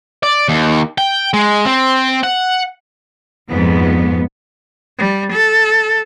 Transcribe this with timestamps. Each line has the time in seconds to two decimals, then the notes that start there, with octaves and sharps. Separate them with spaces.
0.23 D5
0.48 D#2
0.98 G5
1.34 G#3
1.65 C4
2.24 F#5
3.48 F2 G#2 B3
4.98 G3
5.33 A4